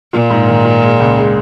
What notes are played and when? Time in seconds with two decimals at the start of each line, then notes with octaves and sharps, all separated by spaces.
0.13 A#2 F4
0.30 G#2
0.47 D#3
0.65 F4
0.83 G#3
1.00 C#2
1.17 G#3